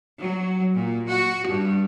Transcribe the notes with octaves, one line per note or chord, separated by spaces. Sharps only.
F#3
A#2
F#4
G2